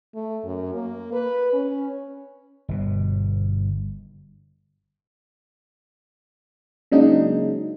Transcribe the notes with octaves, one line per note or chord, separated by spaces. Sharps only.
A3
F#2
A#3
B4
C#4
G1 B2
C#3 F#3 G#3 A#3 D4 D#4